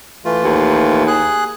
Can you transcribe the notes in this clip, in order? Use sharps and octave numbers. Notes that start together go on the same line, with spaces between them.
E3 A3 F4
D#2
G#4 F#6